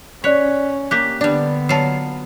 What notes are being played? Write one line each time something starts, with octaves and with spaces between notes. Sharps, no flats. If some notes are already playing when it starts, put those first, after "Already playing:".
C#4 C#5 D5 F#6 B6
A#3 G4 F#6 B6
D3 G3 B3 D4 D5
F#3 F4 A5 C7